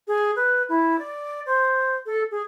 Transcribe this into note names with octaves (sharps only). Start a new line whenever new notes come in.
G#4
B4
E4
D5
C5
A4
G#4